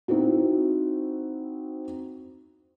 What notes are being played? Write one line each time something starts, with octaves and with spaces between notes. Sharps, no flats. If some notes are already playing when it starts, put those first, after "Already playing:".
C4 D#4 E4 F#4